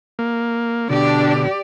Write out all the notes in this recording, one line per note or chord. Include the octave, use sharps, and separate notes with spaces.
A#3
B2 D3 D4 G4 D5